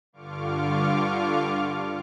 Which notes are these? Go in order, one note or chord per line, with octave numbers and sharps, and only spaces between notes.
G2 D3 F4 C#6 D6 F6